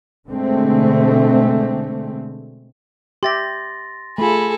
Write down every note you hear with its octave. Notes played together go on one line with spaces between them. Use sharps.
B2 D3 G#3 A3 C4
G4 E5 C6 A6 A#6
A3 F4 G#4 A4 B5